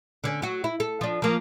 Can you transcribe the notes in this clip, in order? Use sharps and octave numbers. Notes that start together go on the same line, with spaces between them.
D3 C#4
F#3 F#4
E4
A4
F3 D4
F3 A#3